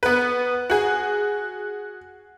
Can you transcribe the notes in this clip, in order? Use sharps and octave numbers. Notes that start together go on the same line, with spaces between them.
B3 B4
F#4 G#4